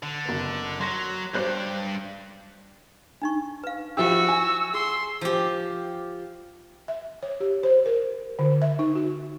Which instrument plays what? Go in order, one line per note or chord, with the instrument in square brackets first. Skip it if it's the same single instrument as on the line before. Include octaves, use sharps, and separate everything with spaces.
[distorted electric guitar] D3
[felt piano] F#1 B3
[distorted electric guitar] F#3 [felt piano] C6 A#6
[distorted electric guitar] G2 D5 [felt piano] C5 F#6 G6
[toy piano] D4 D#4 C#6
B4 F5
[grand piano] F3 E4 G4 [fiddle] F#4 [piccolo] E6
[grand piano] G#5
[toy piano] G#4 [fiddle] C6
[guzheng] F3 G4
[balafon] E5
C#5
G4
C5
A#4
D3
E5
D#4
F#4